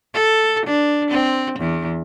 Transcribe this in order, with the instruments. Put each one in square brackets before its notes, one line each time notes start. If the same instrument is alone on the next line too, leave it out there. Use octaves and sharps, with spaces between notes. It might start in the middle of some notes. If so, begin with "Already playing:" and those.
[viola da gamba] A4
D4
C4
E2